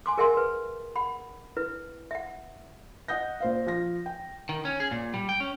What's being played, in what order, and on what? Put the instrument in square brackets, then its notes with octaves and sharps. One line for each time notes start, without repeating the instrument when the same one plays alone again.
[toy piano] G#5 C6 D6
G#4 A#4 E5 F#5 G#5 C6
B4
F#5 B5
E4 B4
E5 F#5
[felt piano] D#5 F#5 D#6 G6 A#6
A#2 C5 F5
F3 F4 A#6
G5
[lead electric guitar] D#3
C#4
G#4
A#2
G3
G5
C#4